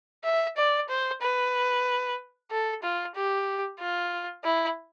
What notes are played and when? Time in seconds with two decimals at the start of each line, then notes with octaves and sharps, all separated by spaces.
0.24 E5
0.57 D5
0.89 C5
1.21 B4
2.51 A4
2.83 F4
3.15 G4
3.80 F4
4.44 E4